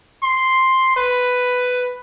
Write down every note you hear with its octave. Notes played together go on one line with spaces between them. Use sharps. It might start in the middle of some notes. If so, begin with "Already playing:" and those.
C6
B4